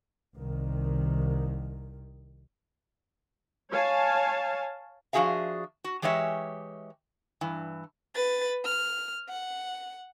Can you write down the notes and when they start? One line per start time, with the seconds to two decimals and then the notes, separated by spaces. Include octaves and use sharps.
0.35 C2 D#3
3.72 C#5 F5 G#5 A5
5.13 F3 D4 F#4 G#4 E5 F5
5.84 F#4
6.02 E3 G#3 G4 C#5 E5
7.41 G2 E3
8.15 B4 A6
8.65 F6
9.29 F#5